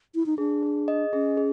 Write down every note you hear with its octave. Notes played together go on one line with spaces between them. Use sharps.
E4
D#4
D4 G#4
G#4
D#5
C#4 G#4
G#4